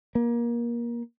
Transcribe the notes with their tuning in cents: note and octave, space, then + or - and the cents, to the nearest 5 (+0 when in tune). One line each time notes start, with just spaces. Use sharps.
A#3 +25